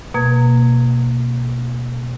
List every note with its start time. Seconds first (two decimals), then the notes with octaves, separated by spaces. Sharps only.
0.14 B2 A#3 G#6